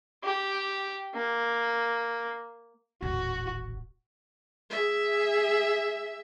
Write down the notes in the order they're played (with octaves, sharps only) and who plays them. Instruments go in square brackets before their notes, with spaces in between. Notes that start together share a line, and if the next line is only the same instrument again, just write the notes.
[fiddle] G4
A#3
[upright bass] D#1 A1 [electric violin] F#4
[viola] G#4 E5